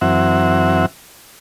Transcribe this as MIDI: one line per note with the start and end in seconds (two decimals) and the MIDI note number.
0.01 0.86 42
0.01 0.86 52
0.01 0.86 60
0.01 0.86 76
0.01 0.86 78